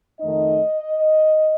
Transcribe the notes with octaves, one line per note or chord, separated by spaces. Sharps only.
F2 D#3 A3 D#4 D#5